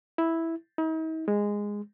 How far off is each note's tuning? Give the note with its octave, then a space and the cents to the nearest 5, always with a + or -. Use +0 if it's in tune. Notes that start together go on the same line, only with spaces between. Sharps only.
E4 -5
D#4 +45
G#3 -10